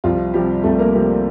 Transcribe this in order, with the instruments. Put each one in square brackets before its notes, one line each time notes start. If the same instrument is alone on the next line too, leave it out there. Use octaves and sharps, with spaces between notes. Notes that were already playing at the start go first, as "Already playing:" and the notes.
[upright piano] C2 F3 F4
C3 F3 G3 G4
C2 A3 A4
A#3 A#4
C3 F3 A#3 A#4